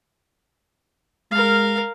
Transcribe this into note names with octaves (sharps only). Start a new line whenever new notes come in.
G#3 A#4 F5